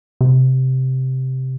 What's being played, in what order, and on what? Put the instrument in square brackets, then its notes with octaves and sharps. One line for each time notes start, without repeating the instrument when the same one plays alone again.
[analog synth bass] C3